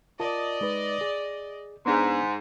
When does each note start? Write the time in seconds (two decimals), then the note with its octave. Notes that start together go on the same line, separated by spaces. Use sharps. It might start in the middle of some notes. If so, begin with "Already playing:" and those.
0.20 F4 A#4 D5 D#5 A5
0.61 G#3 D#4 B4
1.01 G#4
1.86 G#2 B3 D4 G#4